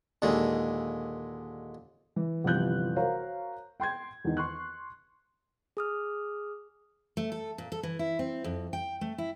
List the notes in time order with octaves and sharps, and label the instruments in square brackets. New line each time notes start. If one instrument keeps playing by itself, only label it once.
[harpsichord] D#2 A#2 D3 G#3
[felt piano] E3
G1 C3 E3 F3 F#6 G6
F#4 A#4 C5 C#5 F5 A#5
G5 C6 G6 G#6
E2 D#3
C6 C#6 F#6
[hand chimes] G#4 D#6 F6
[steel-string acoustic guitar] A3
A4
A#2
A4
E3
E4
C4
F2
G5
A3
E4